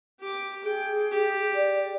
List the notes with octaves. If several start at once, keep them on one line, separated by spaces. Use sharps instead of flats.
G4 D6
G#4 G5
G4
D5